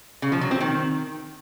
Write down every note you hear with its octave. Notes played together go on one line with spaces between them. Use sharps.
C#3
F3
F#3
C4
D#3